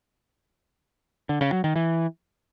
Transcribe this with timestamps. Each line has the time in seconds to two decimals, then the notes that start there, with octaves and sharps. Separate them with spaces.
1.29 D3
1.41 C#3
1.52 F#3
1.64 D#3
1.76 E3